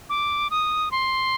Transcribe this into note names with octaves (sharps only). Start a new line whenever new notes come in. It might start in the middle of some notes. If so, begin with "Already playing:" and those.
D6
D#6
C6